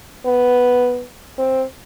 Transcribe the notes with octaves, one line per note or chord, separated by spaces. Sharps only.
B3
C4